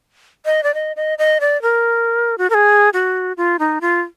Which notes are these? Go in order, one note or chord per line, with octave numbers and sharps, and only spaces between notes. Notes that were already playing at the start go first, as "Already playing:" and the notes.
D#5
D5
D#5
D#5
D#5
D5
A#4
F#4
A#4
G#4
F#4
F4
D#4
F4